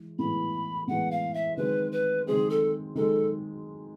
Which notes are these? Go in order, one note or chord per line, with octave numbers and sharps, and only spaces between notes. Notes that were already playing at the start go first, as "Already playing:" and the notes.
Already playing: E3 G#3
A2 E3 G#3 B3 B5
A2 E3 G#3 B3 F#5
F5
E5
D#3 G#3 C4 B4
B4
D#3 G#3 C4 G#4
A4
D#3 G#3 A4